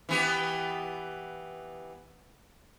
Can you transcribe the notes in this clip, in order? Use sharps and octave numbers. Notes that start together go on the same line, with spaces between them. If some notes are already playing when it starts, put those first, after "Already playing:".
E3 B3 G4